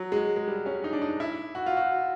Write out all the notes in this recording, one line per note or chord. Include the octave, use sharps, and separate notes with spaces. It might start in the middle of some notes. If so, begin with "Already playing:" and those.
Already playing: F#3
G#3
G#3
G3
C#4
D#4
D4
D#4
E4
F#4
F4
F#4